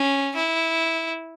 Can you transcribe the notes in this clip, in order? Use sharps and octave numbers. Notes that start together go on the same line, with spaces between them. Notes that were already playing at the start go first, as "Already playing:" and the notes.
Already playing: C#4
E4